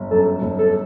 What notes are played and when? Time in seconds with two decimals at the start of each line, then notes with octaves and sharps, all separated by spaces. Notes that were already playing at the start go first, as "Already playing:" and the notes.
Already playing: G1
0.11 F#2 A4
0.42 G1
0.58 A4